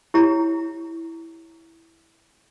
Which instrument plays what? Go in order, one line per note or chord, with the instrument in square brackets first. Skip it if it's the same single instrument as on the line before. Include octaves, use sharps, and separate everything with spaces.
[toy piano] E4 G4 C#5 A#5